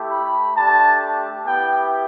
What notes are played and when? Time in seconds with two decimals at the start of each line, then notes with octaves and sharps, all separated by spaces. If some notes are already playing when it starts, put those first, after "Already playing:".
Already playing: A3 E4 G4
0.11 B5
0.55 A3 D4 G4 A5
1.45 B3 E4 G4 G5